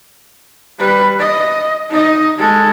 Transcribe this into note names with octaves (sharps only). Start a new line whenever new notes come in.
G3 B4
D#5
D#4 D#5
G#3 A4